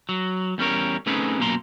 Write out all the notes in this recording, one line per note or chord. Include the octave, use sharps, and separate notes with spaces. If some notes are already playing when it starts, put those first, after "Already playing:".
F#3
E2 G3 C#4 A#4 C#5
A3 C4 C#4 D#4 G#4 B4
F#2 B2 A#3 A#5 C6